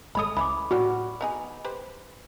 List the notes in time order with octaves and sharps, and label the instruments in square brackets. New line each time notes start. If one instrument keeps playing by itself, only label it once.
[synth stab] G#1 G#3 D#6 [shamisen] A4 C#5 B5
[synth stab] C#2 [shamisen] E3 C#4 [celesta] B5 D6
[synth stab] A2 [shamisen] C#4 G4 D5 [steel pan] F#4
[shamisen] B3 D#4 G#4
G4 B4 C5